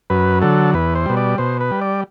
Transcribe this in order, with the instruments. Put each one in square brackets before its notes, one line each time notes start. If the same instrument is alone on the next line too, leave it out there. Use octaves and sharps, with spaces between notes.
[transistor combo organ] F#2 B4
D3 F#3 A4
E2 B4
C5
B2 G3
D5
B2 C5
B4
G3
D5